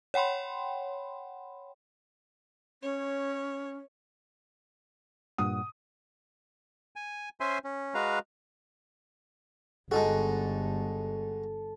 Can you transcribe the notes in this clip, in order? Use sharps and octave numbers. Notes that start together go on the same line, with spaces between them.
C#5 F#5 G5 B5 C6
C#4 C#5
G2 A#2 F#5 D#6
G#5
C#4 C5 E5 G#5 C6
C#4
G#3 F#4 B4 F5 A#5
G1 G#3 D#4 F#4 A4